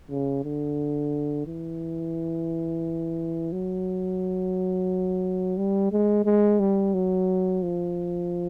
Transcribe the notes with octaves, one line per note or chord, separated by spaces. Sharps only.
C#3
D3
E3
F#3
G3
G#3
G#3
G3
F#3
F3